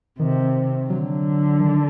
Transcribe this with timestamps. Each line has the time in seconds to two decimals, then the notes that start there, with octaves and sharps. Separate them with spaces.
0.19 C3 D#3
0.90 D3 F#3
1.60 D#3